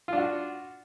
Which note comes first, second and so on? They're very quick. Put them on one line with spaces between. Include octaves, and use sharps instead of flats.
F4 D4 F#4